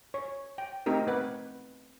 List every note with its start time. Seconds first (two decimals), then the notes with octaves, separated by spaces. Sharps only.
0.14 C#5
0.58 G5
0.86 A3 C4 D#4 G4 A#4
1.07 B3 B4 F#5